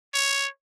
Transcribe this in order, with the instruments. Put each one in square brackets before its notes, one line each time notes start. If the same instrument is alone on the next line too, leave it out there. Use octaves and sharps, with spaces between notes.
[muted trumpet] C#5